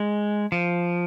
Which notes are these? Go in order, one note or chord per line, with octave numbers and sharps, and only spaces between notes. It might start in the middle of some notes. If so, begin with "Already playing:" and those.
Already playing: G#3
F3